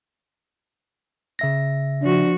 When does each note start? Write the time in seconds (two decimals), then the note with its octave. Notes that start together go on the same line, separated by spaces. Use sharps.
1.39 C#3 E5 A#6
2.02 F3 D4 F#4